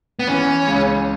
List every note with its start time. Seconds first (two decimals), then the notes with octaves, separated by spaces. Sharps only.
0.19 B3
0.27 E3 C#4
0.67 C#2